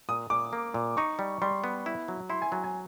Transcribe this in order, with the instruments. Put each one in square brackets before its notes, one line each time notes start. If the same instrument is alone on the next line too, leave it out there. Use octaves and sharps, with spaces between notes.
[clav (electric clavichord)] A#2 [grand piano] D#6
[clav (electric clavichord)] A#2 [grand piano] D6
[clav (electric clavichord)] A#3
A#2
[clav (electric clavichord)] D#4 [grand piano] C#6
[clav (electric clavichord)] G3
[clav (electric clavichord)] G3 [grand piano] C6
[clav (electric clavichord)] B3
E4
F#3
[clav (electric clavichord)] E4 [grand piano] C6
[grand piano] G#5
[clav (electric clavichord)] F#3 [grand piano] G#5
[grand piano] G#5